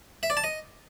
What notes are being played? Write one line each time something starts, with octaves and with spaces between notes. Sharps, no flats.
E5
D5
A5
D#5